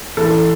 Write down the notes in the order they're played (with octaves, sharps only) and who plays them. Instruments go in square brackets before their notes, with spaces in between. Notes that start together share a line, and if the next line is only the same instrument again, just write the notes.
[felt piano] E3 [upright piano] A4